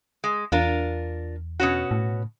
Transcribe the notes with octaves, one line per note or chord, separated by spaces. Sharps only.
G#3
E2 D4 F4 A#4
B2 C#4 F#4
A2